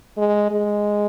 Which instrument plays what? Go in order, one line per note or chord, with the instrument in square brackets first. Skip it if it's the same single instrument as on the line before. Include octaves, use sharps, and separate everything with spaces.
[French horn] G#3
G#3